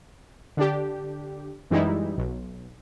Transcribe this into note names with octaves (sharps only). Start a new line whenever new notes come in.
D3 D4 G4
F#2 E3 G3 G#3 D#4 E4
B1